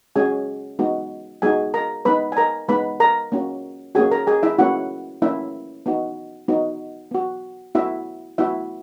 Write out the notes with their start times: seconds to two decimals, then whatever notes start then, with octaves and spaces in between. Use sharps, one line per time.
0.16 G#3 C#4 F#4 G#4 G#5
0.79 G#3 B3 D#4 F#4
1.42 G#3 B3 D#4 F#4 G#4 G#5
1.74 A#4 A#5
2.05 G#3 B3 D#4 B4 B5
2.32 G#5
2.37 A#4 A#5
2.68 G#3 B3 D#4 B4 B5
3.00 A#4 A#5
3.32 A#3 C#4 F#4
3.95 A#3 C#4 F#4 G#4 G#5
4.11 A#4 A#5
4.27 G#4 G#5
4.43 E4 E5
4.58 A#3 C#4 E4 F#4 F#5
5.22 A#3 C#4 E4 E5
5.86 B3 D#4 F#4
6.48 B3 D#4 F#4
7.11 B3 F#4
7.75 B3 E4 F#4 E5
8.38 B3 E4 F#4 E5